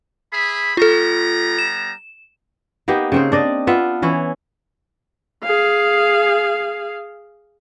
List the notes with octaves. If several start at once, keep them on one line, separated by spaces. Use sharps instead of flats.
G#4 E5 B5
G3 B3 F4 A4 A#5
E7
A#3 B3 D#4 G4
C#3 C4 C5
D4 D5 D#5
B3 F4 E5
E3 C#4 E4
G#4 F5